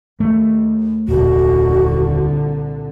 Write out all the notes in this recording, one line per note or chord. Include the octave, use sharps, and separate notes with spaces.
D#2 A3
D#1 C2 A#2 D3 F#4